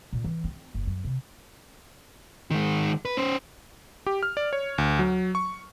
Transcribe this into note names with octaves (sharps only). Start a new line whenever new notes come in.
A#2
E3
C4
F#1
F#2
C3
D#3 G#3
B4
C#4 C5
G4
F6
D5
C#5
D2
F#3
C#6